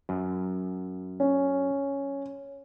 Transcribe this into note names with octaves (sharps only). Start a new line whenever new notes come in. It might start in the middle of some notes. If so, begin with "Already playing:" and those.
F#2
C#4